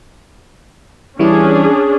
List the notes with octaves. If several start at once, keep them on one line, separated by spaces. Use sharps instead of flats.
E3 G3 C#4 D4 E4 G#4